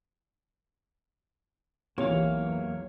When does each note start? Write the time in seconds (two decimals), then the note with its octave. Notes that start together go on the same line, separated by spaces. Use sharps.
1.98 B1 E2 C3 E3 F#3 A#3 C#5 F5